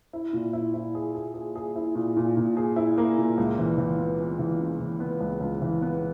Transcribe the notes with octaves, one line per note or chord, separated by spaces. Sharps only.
E4
A#2
E4
E4
G#4
G#4
G#4
G#4
E4
A#2
A#2
A#2
G#4
E4
A#3
A#2
C#2
E3
E3
B3
B3
E3
C#3
E3
B3
C#2
C#2
E3
B3